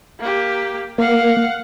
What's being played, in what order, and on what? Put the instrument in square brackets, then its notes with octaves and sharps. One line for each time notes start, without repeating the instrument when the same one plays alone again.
[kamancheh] A#3 G4
[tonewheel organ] A#3 [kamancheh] F5 F#5